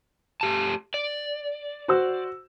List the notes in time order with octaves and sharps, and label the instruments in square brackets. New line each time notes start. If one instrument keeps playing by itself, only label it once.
[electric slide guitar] A3 G4 A5
D5
[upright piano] F#4 C5 E6